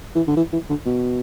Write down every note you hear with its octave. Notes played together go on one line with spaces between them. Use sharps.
E3
D3
E3
E3
D3
B2